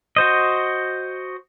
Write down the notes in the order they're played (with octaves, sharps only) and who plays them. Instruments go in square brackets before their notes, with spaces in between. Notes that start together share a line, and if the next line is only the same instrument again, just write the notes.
[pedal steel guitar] F#4 C5 D#5